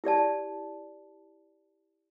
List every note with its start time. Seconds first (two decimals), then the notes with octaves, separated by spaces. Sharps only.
0.04 E4 G4 D5 A5